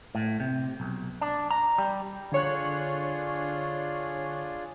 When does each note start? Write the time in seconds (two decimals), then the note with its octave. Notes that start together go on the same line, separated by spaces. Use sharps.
0.15 A2
0.40 C3
0.80 B1
1.21 D4
1.51 A#5
1.78 G3
2.32 D3 D4 F4 G#4 C#5 F#6